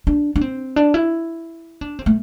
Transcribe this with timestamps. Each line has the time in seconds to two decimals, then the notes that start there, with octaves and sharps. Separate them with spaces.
0.07 D4
0.36 D4
0.41 C4
0.76 D4
0.94 E4
1.81 D4
1.99 C4
2.06 A3